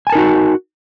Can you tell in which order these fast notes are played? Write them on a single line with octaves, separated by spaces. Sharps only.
G#5 A5 A#4 D#4 F#4